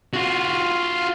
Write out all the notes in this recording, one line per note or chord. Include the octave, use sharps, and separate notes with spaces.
F4 F#4